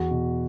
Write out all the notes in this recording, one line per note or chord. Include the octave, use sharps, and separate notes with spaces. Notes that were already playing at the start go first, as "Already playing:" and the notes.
Already playing: E2 F#4
B2